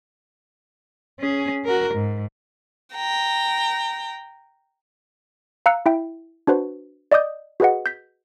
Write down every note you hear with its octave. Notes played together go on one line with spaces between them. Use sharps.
C#4 G#4
F#4 A#4
G#2
G5 A#5
F5 A#5 E6 F#6 C#7
E4 E5 G5
D4 F#4 B4 C5
D5 D#5 D6 D#6 G6
F#4 G#4 B4 D#5 F#5
G6 B6